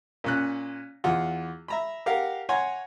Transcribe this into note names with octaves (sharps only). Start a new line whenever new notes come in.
A#2 C#4 F#6
E2 F4 F#5
E5 A#5 B5
G4 A#4 F5 F#5
C#5 F#5 G#5 A#5 C6